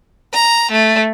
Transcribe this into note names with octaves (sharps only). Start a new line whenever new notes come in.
A#5
A3